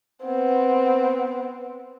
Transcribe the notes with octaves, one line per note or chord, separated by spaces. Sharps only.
B3 C4